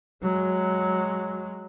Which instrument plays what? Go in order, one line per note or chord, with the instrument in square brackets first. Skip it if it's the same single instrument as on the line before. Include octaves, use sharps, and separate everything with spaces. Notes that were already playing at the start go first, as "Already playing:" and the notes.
[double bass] F#3 G#3